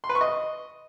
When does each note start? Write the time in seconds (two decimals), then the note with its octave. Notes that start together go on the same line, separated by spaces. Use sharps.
0.04 C6
0.09 B4
0.15 C#6
0.21 D#5